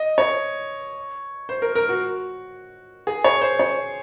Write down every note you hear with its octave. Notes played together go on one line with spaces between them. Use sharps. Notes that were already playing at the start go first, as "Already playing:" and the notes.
Already playing: D#5
C#5
C5
A#4
A#4
F#4
G#4
C#5
C5
C#5